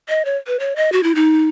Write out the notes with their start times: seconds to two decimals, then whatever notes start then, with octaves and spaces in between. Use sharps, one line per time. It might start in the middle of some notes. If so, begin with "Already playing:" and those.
0.09 D#5
0.25 C#5
0.47 B4
0.60 C#5
0.76 D#5
0.92 F#4
1.03 E4
1.15 D#4